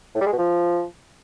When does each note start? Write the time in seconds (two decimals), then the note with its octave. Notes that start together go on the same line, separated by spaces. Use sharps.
0.15 A2
0.21 G3
0.27 G#3
0.33 B2
0.38 F3